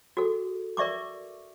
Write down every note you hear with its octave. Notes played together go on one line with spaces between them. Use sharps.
F#4 G#4 A4
A#4 D5 E5 C#6 D6